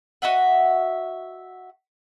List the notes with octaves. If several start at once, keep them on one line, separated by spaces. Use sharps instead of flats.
F#4 D#5 E5 F#5